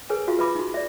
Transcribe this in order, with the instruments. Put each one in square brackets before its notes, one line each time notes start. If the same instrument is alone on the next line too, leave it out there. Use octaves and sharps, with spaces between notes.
[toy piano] G#4 A#4 B4 C#5 G#5
F4 F#4 G#4 E5 F5
B4 E5 A5 B5 D6
D#4 F#4
D5 E5